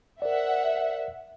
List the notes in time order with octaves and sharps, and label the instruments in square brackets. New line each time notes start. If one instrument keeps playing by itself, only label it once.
[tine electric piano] A#4 C5 D5 [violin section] E5 F#5